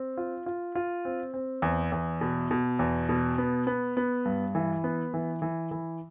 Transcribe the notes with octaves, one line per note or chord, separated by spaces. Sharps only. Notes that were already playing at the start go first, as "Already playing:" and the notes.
Already playing: C4
F4
F4
F4
C4
C4
E2
E2
B2
B2
E2
B2
B3
B3
B3
G2
E3
B3
E3
E3
E3